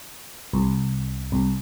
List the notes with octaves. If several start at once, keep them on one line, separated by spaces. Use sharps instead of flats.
C2
C2